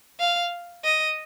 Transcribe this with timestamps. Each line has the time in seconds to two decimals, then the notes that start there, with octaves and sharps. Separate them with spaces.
0.20 F5
0.84 D#5